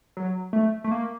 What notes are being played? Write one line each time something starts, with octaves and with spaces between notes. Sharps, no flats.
F#3
A3
A3
A#3